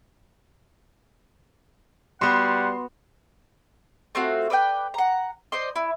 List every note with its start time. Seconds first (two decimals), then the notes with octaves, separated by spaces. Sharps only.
2.21 G3 B3 F#4 F#5 C6
4.15 A3 C4 F4 F#4
4.50 B4 D5 E5 G5
4.94 F#5 A#5
5.52 C5 D5 D#5 C6
5.76 E4